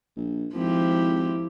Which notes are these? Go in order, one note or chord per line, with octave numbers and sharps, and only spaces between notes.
A#1
G#1 F3 E4 G4